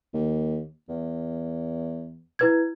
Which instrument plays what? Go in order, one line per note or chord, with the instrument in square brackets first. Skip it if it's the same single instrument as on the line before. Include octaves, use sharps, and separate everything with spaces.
[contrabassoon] D#2
E2
[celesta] E4 B4 G#6